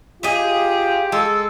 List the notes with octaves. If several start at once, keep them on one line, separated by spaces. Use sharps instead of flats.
F4 G4 G#4 D#5 E5
G#3 G#4 A4 A5 E6